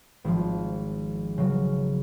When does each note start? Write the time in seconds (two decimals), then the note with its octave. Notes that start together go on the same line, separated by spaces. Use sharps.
0.24 G#1 F3
1.38 C#3 F#3